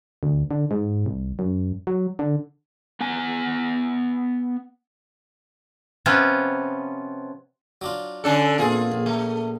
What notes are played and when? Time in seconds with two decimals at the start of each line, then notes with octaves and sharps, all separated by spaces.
0.23 D2
0.51 D3
0.71 G#2
1.06 C2
1.39 F#2
1.87 F#3
2.19 D3
3.00 B3 F#5 G#5
6.06 C3 F3 B3 C#4
7.81 F#3 D4 F4
8.24 D3 C#4 A4
8.59 A#1 E2 C4 F4 G#4
8.92 A#1
9.06 A3